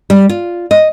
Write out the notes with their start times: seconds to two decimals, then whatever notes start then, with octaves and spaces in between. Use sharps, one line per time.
0.10 G3
0.29 F4
0.71 D#5